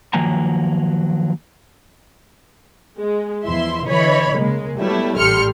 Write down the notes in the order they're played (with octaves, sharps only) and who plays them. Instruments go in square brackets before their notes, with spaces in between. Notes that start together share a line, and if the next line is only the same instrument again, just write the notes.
[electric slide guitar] D#3 F3 F#3 A#3 G#5 A#5
[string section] G#3
E2 F3 E4 E5 C6
D3 E3 C#5 D#5 B5
C#3 G#3 A#3
F#3 G3 A3 B3 E4
A1 G3 A4 C6 F6 C#7